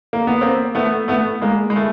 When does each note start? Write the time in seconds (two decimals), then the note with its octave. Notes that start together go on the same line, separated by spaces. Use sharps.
0.13 A#3
0.27 B3
0.41 A#3 C4
0.75 A3 B3
1.08 A3 B3
1.42 G#3 A#3
1.70 G#3
1.76 A3